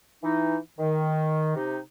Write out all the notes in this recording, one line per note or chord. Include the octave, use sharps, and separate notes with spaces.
E3 D#4
D#3
C3 D#4